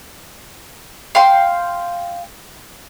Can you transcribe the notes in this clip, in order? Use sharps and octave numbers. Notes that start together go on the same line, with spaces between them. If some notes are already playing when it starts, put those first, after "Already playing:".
F5 G5 C6